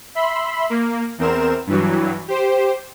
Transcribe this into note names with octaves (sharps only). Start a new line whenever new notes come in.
E5 B5 C6
A#3
E2 C4 A#4 E7
G2 E3 F#3
G4 C5